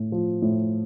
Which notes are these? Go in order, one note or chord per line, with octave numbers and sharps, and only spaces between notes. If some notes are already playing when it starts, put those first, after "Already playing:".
Already playing: A2
F3
A2